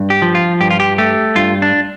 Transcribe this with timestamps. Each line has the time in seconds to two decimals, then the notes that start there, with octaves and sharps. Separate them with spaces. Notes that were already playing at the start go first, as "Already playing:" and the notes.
Already playing: G2
0.10 G4
0.22 F3
0.35 F4
0.60 G2 G4
0.71 F4
0.80 G4
0.98 A3 G4
1.36 G2 F4
1.62 D4